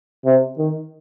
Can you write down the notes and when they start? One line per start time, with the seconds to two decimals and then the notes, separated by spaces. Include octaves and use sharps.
0.25 C3
0.58 D#3